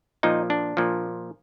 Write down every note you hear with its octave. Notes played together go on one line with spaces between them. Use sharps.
A#2 F3 D#4
D4
A#2 F3